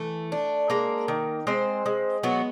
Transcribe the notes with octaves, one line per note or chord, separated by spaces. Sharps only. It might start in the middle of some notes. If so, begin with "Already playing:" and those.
Already playing: E3 A3
D4
G#3 A#3 A#4
D#3
G#3 C4 C5
G#3
F#3 B3 F#4